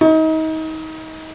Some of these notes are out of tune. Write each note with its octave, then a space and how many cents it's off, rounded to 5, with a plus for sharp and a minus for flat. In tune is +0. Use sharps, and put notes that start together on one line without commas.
D#4 +30